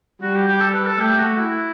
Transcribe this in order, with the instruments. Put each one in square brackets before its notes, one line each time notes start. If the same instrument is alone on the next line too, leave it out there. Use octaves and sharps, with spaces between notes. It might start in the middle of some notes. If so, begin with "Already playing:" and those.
[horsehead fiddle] G3 [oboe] F#4
[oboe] G4
G4
A4
B4
A4
[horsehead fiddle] A3 [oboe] G4
[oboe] F#4
E4